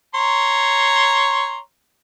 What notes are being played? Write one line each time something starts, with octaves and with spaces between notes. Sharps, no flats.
C#5 A#5 C6